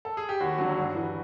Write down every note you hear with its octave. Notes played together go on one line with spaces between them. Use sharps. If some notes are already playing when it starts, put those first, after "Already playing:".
A4
G#4
G4
D#2 F#4
D3 F#3
G2
E3